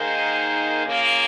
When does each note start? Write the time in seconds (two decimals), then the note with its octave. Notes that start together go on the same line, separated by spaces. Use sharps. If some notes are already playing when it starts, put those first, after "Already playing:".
Already playing: D#3 A#3 D#4 G#4 C5
0.86 C#3 F3 A#3